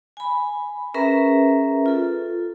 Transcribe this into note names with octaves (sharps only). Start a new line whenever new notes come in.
G#5 B5
C#4 G#4 A#4 B4 E5 A#5
F4 A4